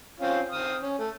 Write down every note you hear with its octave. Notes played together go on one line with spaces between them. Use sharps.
C4 C#4 F4
C4 D#6 F6
C#4
A3